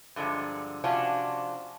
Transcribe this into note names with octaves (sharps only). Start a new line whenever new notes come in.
G2 D3 F3 G#3 D#4
C3 F3 C#4 D4 F4 F#4